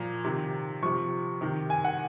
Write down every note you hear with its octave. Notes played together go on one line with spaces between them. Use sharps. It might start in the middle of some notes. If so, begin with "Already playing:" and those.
Already playing: A#2 F3 A#5
C3 D#3
C3 F3 C#6
C3 D#3
G#5
F#5